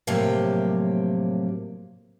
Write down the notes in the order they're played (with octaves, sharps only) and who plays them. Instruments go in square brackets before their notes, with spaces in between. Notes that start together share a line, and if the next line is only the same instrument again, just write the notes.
[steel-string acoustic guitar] A2 C3 F3 F#3 A#3 G4